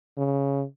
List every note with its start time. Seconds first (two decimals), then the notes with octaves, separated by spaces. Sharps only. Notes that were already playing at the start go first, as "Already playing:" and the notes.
0.17 C#3